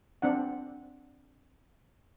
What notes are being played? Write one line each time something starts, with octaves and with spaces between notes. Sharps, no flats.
C4 D4 F#5